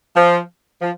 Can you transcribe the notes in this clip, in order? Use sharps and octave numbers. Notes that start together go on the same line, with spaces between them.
F3
F3